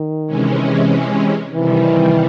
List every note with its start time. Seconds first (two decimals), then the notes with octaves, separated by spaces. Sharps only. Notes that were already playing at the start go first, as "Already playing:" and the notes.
Already playing: D#3
0.27 C3 E3 G#3 C#4
1.54 C3 D#3 E3 G3